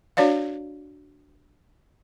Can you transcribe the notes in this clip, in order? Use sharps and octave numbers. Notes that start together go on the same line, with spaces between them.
D4 F#4 C#5 D5 F5